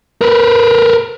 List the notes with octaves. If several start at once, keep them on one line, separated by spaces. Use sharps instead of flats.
A#4 B4